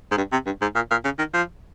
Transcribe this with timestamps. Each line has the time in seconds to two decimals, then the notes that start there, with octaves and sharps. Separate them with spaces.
0.11 G#2
0.17 G2
0.32 C3
0.46 G2
0.62 G#2
0.75 A#2
0.91 A#2
1.04 C#3
1.18 D#3
1.33 F3